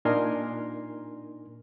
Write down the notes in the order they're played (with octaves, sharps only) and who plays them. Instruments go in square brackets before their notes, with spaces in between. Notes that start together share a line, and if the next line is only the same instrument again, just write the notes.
[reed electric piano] A#2 D4 D#4 A#4 G#5 C6